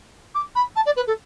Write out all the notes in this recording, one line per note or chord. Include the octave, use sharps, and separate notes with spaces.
D6
B5
A5
D5
B4
A4